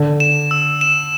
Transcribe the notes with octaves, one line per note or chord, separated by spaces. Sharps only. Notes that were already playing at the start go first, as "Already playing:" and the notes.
Already playing: D3
E7
E6
E7